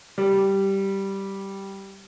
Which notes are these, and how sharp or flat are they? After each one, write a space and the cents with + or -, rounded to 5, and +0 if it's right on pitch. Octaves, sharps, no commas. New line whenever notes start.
G3 -5